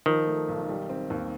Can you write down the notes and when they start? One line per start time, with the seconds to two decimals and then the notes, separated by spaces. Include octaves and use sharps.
0.06 D#3 F3
0.27 A3
0.48 B1
0.69 G3
0.89 C4
1.10 D#2